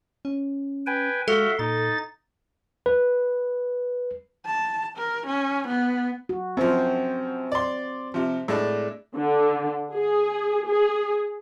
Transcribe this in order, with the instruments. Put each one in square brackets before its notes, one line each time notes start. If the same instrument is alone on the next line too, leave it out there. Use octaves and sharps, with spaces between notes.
[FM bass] C#4
[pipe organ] B4 G5 G#5
[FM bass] G#3 [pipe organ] F#4 E5 F5 [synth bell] A4
[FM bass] A#2 [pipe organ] D#4 A6
[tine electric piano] B4
[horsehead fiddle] A5
A#4
C#4
B3
[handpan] F#4
[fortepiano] F#2 F3 [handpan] C4 C5
[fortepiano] D5 C6
C3 F3
A2 G#3 D4
[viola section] D3
G#4
G#4